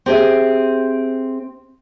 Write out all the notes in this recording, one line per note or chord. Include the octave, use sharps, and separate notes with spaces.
C4 G4 G#4 E5